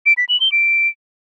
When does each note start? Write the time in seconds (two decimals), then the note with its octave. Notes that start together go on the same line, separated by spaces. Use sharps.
0.06 D7
0.17 B6
0.29 F#7
0.40 G7
0.52 D7